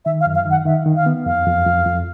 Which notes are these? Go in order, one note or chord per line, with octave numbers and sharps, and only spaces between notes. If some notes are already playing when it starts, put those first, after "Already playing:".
D#3 E5
F5
F#2
F5
D#3
F#5
D#3 E5
D#3
F5
B3
F2 F5
F2
F2
F2